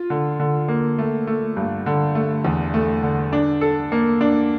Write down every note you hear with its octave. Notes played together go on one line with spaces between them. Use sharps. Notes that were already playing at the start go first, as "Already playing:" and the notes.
Already playing: F4
D3
D3
A#3
A3
A3
G2
D3
A3
E2
A3
D3
D4
A4
A#3
D4